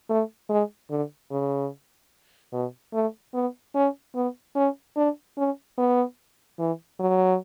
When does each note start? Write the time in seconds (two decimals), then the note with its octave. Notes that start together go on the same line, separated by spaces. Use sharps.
0.09 A3
0.49 G#3
0.90 D3
1.31 C#3
2.53 B2
2.93 A3
3.34 B3
3.75 C#4
4.15 B3
4.55 C#4
4.96 D4
5.38 C#4
5.78 B3
6.59 E3
7.00 F#3